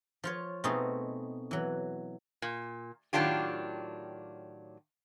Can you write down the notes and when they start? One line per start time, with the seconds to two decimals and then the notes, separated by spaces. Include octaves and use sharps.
0.24 F3 F4 C#5
0.64 B2 A3 C4 D#4 G#4
1.51 E3 F#3
2.42 A#2
3.13 A2 D#3 F#3 D4 F4 G4